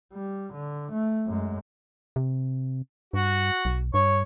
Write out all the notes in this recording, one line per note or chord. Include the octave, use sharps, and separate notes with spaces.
G3
D3
A3
F#2 G#3
C3
G2 F#4
B1
G2 C#5